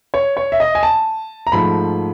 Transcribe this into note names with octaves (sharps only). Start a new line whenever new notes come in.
C#5
C#5
E5
D#5
G#5
A5
A#5
G#2 F3 A3 B5